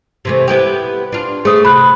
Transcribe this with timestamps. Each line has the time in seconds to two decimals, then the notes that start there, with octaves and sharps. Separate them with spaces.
0.25 C3 E3 A3
0.47 B3 E4 G4
1.12 D4 F4
1.45 A3 B3 G#4 C5 D#6
1.65 C3 B5 F#6